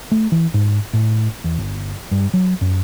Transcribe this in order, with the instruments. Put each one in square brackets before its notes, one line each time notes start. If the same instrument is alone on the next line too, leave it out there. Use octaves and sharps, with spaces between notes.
[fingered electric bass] A3
E3
G#2
A2
E2
G1
G2
F#3
F#2